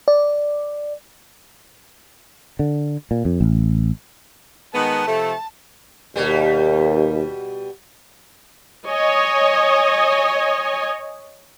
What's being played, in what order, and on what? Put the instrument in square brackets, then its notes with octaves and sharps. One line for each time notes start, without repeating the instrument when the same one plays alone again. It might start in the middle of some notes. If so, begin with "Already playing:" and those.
[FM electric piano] D5
[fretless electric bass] D3
A#2
F2
A1
[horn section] D#3 G#3 B3 [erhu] A5
[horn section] C3 F3 A3
[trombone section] D#2 [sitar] B2 G3
[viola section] C#5 D#5 G#5